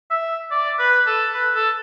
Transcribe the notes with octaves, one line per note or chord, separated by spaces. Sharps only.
E5
D5
B4
A4
B4
A4